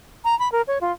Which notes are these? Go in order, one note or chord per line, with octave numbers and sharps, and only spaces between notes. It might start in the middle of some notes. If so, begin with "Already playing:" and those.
A#5
B5
A#4
C#5
F4